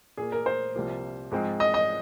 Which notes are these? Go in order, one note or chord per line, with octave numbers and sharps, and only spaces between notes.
A#2 A#3 G#4
A#4
C5
C2 C3 F3 A#3
G#2 F3 G#3 C4
D#5
D#5